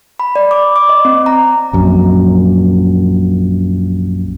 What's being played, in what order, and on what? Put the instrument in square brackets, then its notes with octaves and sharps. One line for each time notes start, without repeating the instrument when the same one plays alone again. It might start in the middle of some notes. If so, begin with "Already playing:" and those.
[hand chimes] B5
D5
D6
D6
D#5
C4
A#5
[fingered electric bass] A#1 F#2